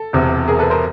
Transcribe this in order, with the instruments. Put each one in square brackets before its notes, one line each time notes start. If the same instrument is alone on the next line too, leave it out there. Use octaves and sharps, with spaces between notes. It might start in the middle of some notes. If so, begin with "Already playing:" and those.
Already playing: [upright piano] A4
E1 E2 C3
G#4 A#4
A4 B4
A#4 C5